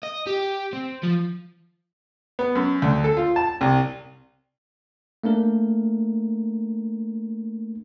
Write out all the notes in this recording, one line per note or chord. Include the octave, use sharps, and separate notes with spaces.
D#5
G4
C4
F3
B3
F#2
D2
A4
F4
A5
C2
A3 A#3 D4 A#4